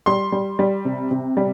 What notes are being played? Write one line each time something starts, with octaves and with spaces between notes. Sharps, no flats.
G3 C6
G3
G3
C3
C3
G3